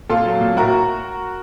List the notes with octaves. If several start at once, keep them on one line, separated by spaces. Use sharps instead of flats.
A#2 F4 A4
F#3
A#2
A2 F#4 A#4